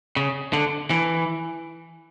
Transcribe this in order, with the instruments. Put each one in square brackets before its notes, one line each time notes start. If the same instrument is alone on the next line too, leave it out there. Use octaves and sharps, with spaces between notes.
[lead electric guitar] C#3
D3
E3